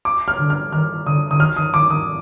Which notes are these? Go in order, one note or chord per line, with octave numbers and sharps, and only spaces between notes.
D6
F6
D3
F6
D#3 F6
D3 D#6
D3 D#6
D#3 F6
D#3 D#6
D#3 D6
D#3 D#6